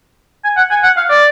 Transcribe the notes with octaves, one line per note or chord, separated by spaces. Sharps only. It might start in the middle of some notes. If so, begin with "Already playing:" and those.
G#5
F#5
G#5
F#5
F5
D5